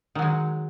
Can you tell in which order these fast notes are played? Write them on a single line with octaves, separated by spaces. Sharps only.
D#3 F#3 G#3